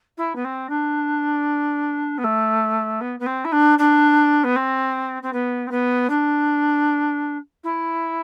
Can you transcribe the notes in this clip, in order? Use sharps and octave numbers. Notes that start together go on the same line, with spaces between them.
E4
B3
C4
D4
B3
A3
B3
B3
C4
E4
D4
D4
B3
C4
C4
B3
C4
B3
D4
E4